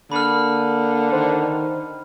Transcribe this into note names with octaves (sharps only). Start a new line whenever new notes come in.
D3 A#3 B5 F6
D#3 C5